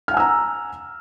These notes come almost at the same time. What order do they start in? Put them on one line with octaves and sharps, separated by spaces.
F6 F#5 G#5 E6 A#5